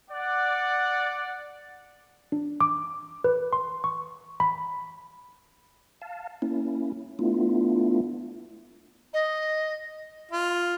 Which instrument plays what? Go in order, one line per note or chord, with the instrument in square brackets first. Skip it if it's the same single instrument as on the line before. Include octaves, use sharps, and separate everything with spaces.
[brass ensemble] D5 F#5
[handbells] D4
D6
B4
C6
C#6
B5
[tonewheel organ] F5 A5
A#3 C#4 E4
A3 B3 D4 E4 F4
[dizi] D#5
[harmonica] F4